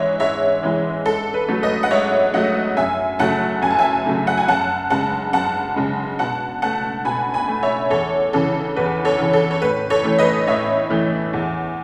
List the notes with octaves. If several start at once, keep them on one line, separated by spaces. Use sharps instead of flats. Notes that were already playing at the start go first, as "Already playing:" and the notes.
Already playing: G#2 E3 G#3 C#5 D#5 E5
G#2 C#5 E5
E3 G#3
G#2 A4
B4
F#3 A3
B4 D#5
F#5
G#2 C#5 E5
F#3 A3 D#5 F#5
F#2 E5 G#5
C#3 F#3 A3 F#5 A5
F#2 G#5
A5
E5 G#5
C#3 F#3 A3
F#5
G#5
F#2 F#5 A5
C#3 G#3 F#5 A5
F#2 F#5 A5
C#3 G#3
B2 F#5 A5
A3 F#5 A5
B2 G#5 B5
G#5 B5
A3
C#5 E5
E2 A4 C#5
C#3 E3 A4
E2 B4
A4 C#5
C#3 E3
A4
C#5
A2 B4
A4 C#5
E3 A3
B4 D#5
A2 C#5 E5
E3 A3
E2